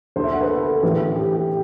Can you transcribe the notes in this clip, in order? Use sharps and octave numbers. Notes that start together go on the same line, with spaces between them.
D2 D3 C5
E5
F#5
B4
A4
A1 A2 E3 B4
G4
G4